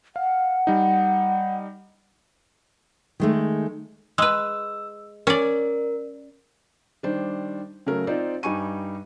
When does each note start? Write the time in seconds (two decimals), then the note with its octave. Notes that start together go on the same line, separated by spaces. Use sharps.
0.16 F5 F#5
0.67 G3 D#4
3.20 D#3 G#3 A3
4.18 G#3 B4 E6
5.27 C#4 A#4 D5
7.03 D#3 G3 D4 C5
7.86 C#3 F#3 A3 A#4
8.07 C4 D#4 F4 C5 D5
8.43 G2 G3 D#4 G#5 C#6 D#7